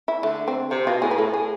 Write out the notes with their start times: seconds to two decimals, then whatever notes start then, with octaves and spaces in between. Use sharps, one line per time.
0.08 E4
0.23 D3 A3
0.48 C4
0.71 C3 C4
0.87 B2 F4
1.02 A2 G#4
1.11 B4
1.18 A2 A4
1.34 G#4